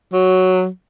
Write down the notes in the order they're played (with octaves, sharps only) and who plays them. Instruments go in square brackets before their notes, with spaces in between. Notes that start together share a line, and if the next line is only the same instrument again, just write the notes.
[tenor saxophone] F#3